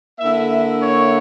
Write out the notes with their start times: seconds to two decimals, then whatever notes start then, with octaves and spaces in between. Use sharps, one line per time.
0.20 D3 A#3 E4 E5
0.81 C#5